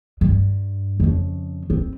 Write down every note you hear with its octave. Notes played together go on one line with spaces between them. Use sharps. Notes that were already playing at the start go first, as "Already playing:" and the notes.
G2
F2 C#3
C4